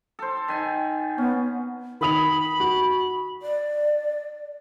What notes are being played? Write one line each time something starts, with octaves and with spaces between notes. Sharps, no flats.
A4 C5
D#3 G#5 A5
B3 C#4
D#3 B5 D#6 F7
F#4
D5